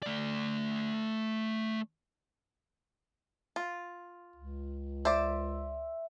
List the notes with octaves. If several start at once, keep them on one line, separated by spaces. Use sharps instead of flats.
A3 D5
F4
C#2
C5 D5 E5